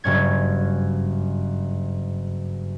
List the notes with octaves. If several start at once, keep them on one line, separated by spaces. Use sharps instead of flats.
F#1 G2 C#4 G#6